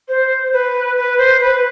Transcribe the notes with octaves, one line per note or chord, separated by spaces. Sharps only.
C5
B4
B4
C5
B4